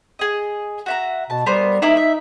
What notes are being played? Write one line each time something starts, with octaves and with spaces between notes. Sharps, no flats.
G#4 D#5
F#4 E5 A#5
B2 A5
G3 B3 A#4 C5
A#3 D#4 E4 D5
E5